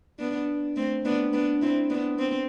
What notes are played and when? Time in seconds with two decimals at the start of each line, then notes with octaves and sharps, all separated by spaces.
0.19 B3 D4
0.76 A3 C4
1.05 B3 D4
1.33 B3 D4
1.62 C4 E4
1.90 B3 D4
2.19 C4